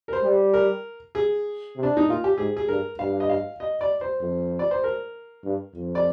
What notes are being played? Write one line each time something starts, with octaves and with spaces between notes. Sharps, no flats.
A#4
C5
G3
A#4
G#4
C3
D4
D#4
A#2 F4
G4
G#2 G#4
G#4
G2 A#4
G2 F5
D#5
F5
D#5
D5
C5
F2
D5
C5
A#4
G2
F2
D5